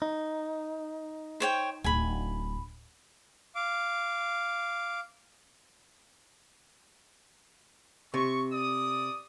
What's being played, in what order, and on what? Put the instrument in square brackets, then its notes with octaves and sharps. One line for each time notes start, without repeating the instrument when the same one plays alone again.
[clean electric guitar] D#4
[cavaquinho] C5 C#5 G5
[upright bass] D1 [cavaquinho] G#5 B5
[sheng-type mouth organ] F5 D6
[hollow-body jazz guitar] C3 [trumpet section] C#6
[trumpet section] D5 D#6